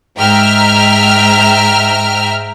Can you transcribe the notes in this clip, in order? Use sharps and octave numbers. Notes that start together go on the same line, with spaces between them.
G#2 E5 G5 A#5 F6